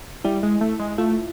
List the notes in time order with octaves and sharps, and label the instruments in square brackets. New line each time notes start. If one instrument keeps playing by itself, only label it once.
[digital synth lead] G3 [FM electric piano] E4
[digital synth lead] G#3
A3
G#3
[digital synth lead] A3 [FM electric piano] F4